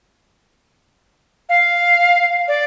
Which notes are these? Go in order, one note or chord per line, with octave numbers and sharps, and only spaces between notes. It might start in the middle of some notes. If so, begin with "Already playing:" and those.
F5
D5